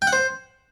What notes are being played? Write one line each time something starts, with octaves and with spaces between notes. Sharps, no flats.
G5
F#5
C5